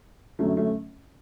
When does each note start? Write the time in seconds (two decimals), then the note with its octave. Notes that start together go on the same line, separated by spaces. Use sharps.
0.39 F#2 D3 F#3 A3 C#4
0.56 A3 C#4